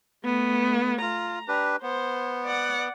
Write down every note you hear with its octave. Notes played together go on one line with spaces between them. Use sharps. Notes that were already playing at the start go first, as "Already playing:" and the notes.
A3 B3
F4 A#5
D4 G4 B4
B3 C5
D5 F#5